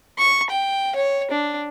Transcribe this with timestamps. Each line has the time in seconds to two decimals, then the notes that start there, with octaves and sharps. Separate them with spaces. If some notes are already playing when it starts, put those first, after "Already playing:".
0.18 C#6
0.50 G5
0.95 C#5
1.31 D4